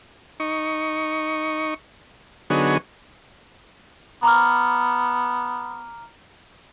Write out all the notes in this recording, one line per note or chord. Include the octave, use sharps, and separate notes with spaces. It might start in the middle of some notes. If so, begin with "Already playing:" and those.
D#4 C#6
D3 F#3 B3 D#4 G#4 C#5
B3 A#5 D6 F6